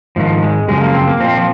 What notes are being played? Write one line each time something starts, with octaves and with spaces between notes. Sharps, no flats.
G#2 D#3 F3
G#3
F#2 C#3 F3 G#3
A#3
C4
A#3
A#2 F3 C4
F3